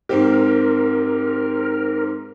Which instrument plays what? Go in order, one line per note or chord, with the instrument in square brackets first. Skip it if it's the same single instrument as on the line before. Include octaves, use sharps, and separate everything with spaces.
[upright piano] G#2 C4 G4 [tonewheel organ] A#4